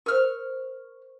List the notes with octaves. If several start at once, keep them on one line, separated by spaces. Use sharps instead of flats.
A#4 C5 C#6 F6